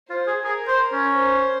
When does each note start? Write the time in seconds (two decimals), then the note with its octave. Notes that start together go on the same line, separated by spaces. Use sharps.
0.10 F4 C5
0.27 G#4
0.44 G#4 A#4
0.68 C5
0.93 C#4
1.16 C5